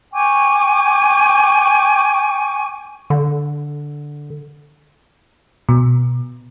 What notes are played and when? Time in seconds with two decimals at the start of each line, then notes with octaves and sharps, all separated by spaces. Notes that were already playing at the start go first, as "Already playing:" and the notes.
0.13 G5 G#5 C#6 D6
3.10 D3
5.69 B2